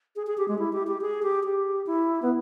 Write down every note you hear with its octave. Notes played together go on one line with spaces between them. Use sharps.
G#4
G#4
G4
G#3
E4
G4
G4
G#4
G4
G4
E4
B3